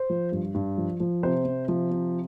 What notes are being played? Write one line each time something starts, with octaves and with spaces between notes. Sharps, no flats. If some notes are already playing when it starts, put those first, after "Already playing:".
Already playing: C5
F3
G2
G2
F3
F3
C3 C5
C3
F3
C3